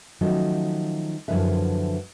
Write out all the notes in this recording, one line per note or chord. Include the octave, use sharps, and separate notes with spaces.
D#3 F3 F#3 A3 C#4
F#2 D3 F3 E4 B4 E5